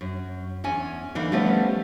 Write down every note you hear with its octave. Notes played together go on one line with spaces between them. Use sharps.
F#2
E2 C#4 G#5
D3 E3 A#3 D#4
F3 G3 A3 B3 C#4